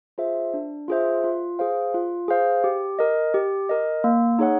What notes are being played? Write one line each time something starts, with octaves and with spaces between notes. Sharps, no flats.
F4 G#4 C5 E5
D4
F4 G#4 C5 E5
F4
G#4 C5 F5
F4
G#4 C5 F5
G4
A#4 D#5
G4
A#4 D#5
A#3
D#4 G#4 C#5 F#5